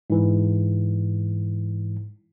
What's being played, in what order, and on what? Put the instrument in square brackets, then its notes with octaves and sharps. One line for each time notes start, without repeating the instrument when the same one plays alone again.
[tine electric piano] G#2 E3